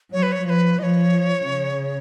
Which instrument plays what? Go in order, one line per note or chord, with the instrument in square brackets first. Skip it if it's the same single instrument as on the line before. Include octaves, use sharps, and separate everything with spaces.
[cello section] F#3 [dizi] C#5
[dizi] B4
C#5
[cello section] F3 [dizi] B4 C#5
[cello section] F3 [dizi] D#5
[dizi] C#5
[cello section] C#3